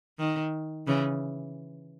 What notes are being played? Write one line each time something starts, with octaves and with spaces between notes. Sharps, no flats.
D#3
C#3 E3